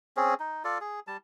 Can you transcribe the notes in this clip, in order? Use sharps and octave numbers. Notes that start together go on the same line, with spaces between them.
C4 C#4 G#4
D#4
F4 A4 D5
G#4
G3 A5